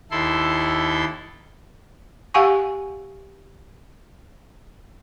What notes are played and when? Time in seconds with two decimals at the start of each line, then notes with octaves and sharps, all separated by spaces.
0.11 D#2 E4 A4 C6
2.34 G4 F5 F#5 G#5 C#6